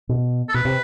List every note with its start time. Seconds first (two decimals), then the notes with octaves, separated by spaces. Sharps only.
0.09 B2
0.49 A4
0.54 B2 B4
0.65 C3